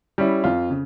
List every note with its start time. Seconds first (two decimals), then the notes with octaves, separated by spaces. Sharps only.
0.18 G3 C#4 E4
0.44 F2 F4
0.70 C#3